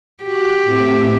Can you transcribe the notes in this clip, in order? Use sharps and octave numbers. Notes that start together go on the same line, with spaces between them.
F#4 G4 F#6
A2 C4 E5